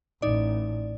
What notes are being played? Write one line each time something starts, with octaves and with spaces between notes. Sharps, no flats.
A1 D#4 D5